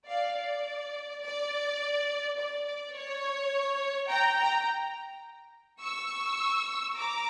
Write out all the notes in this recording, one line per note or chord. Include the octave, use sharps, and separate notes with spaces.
D5 F5
D5
D5
D5
D5
C#5
G5 A#5
G5 A#5
C#6 E6
A#5 D6